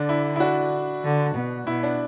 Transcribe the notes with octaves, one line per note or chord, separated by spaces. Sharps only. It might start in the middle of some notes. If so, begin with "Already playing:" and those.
Already playing: D3 D4
E4
E4
D4 F#4
D3
B2
B2 E4
D4